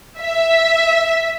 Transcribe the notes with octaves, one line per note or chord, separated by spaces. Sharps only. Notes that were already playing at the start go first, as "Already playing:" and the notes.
E5